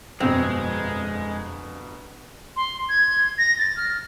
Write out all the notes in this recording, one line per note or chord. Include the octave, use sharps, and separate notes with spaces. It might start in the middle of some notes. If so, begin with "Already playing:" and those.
G1 F2 B2 G#3 C4
C6
G#6
A#6
A6
F6